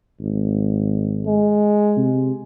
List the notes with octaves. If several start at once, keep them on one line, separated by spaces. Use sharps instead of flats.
G#1
G#3
C3